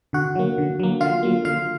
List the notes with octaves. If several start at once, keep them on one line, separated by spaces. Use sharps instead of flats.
D3 F#4 F#5
F#3 A#3
D3
F#3 A#3
D3 F4 F5
F#3 A#3
D3 F4 F5